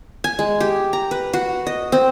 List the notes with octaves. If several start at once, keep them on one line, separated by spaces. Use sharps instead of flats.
G#5
G#3
G4
A#5
B4
F#4
D#5
C4